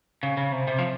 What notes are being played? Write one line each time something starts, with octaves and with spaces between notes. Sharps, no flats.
C#3
C#3
C3
C3
F3